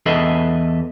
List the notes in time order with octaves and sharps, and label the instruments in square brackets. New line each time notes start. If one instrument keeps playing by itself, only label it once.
[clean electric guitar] E2 G#4 A4 B4 D#5 E5